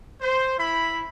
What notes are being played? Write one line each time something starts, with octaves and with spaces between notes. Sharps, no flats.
C5
E4 B5